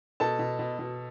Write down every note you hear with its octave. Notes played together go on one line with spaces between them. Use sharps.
B2 A4 A5
B2
B2
B2